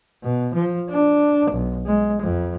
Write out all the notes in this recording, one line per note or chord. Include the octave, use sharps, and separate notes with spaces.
B2
F3
D4
B1
G#3
F2